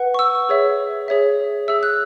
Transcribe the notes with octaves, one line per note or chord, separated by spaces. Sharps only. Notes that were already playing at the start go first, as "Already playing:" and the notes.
Already playing: B4 F#5
C#6
E6
G#4 C#5 E5
G#4 C#5 E5
G#4 E5 E6
F#6